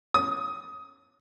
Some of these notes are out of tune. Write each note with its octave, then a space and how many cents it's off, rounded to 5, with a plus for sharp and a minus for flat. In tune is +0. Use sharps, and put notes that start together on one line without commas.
D#6 +15